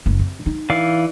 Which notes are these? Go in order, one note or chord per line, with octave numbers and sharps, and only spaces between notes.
F#1
C3
D#4
E3 D5 F5